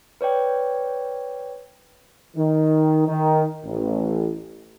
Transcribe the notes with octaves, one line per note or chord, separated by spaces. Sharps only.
B4 C#5 D5 G5
D#3
D#3
A1